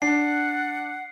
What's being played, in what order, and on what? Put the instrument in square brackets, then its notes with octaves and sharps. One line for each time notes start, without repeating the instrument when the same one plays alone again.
[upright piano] D4 [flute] F#5 [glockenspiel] C7